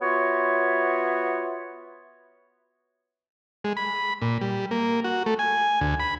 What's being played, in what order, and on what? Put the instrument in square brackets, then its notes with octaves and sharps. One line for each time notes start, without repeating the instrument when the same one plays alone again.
[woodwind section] B3 F4 F#4 C#5 E5
[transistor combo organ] G#3
B5
A#2
G3
A#3
F#4
A3
G#5
D2
B5